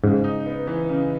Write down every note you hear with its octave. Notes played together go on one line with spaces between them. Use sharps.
G#2 C#3
D#4
B3
E3
C#3